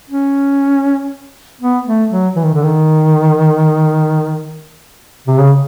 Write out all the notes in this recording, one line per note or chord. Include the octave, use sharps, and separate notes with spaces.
C#4
B3
A3
F#3
E3
D#3
D3
D#3
C3
C#3